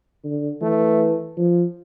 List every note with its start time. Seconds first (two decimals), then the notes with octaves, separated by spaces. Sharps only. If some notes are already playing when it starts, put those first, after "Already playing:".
0.24 D3
0.62 E3 A3
1.37 F3